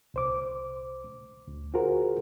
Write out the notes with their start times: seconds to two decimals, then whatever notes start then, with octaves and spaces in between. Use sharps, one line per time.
0.14 C2 C5 D6
1.48 D2
1.74 F4 F#4 G#4 A#4 C5